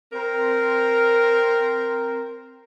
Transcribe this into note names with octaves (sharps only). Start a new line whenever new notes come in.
C4 A#4